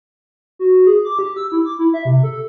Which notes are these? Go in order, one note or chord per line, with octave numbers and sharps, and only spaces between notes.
F#4
G#4
D6
G4
E6
E4
D6
E4
E5
C3
A4